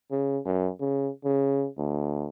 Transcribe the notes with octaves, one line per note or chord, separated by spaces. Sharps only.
C#3
F#2
C#3
C#3
D2